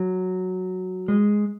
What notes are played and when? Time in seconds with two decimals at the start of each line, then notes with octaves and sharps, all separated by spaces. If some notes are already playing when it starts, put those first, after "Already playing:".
Already playing: F#3
1.08 G#3